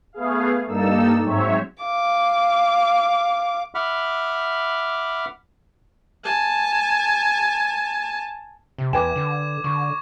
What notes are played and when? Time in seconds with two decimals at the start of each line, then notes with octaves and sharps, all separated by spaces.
0.13 A3 B3 G#4 F5
0.67 G2 A#3 D#4 A4 E6
1.24 G#2 F#3 C4 C#5 E5
1.83 F5 D6
3.75 E5 F#5 B5 D6 F6
6.25 G#5 A5
8.78 C3
8.93 E2 B4 G5 G#5 D6 G#6 E7
9.16 D3
9.64 D3 C#6